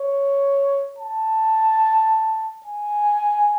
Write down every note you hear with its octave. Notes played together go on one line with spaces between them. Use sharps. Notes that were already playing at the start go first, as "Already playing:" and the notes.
Already playing: C#5
A5
G#5